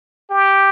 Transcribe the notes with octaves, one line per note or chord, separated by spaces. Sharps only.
G4